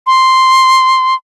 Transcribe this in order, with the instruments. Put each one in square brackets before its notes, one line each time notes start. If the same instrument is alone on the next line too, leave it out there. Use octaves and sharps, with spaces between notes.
[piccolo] C6